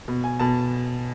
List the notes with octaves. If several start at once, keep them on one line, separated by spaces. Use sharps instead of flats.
B2
G#5
B2 A5